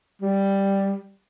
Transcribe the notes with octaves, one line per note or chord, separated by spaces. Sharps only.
G3